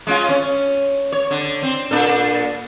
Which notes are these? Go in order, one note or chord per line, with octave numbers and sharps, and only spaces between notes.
G#3 C#4 F4
C#4
C#5
D3
C4
A#2 D4 A4